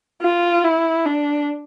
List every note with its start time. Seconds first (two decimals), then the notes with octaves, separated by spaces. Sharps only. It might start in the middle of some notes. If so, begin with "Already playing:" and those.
0.22 F4
0.64 E4
1.05 D4